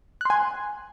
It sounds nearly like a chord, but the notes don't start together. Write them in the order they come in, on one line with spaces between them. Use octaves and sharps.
F#6 C6 G#5